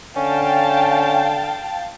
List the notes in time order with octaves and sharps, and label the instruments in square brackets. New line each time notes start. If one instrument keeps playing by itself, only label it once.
[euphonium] D3 [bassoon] C#4 [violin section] F5 G5 A5